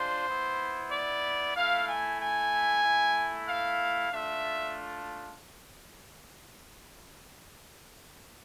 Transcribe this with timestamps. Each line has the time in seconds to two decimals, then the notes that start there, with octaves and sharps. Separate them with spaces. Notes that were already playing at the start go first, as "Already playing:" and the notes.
Already playing: G#3 D4 F4 C5
0.28 B3 E4
0.92 D5
1.56 A3 E4 F5
1.87 G#5
2.19 G#5
2.83 A3 E4
3.47 F5
4.11 A3 D4 F4 E5